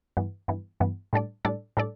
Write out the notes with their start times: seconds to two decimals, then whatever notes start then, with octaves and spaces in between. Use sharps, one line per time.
0.17 G2 E3 B3
0.48 G2 E3 B3
0.80 G2 E3 B3
1.13 A2 G3 D4 A4 D5
1.45 A2 G3 D4 A4 D5
1.77 A2 G3 D4 A4 D5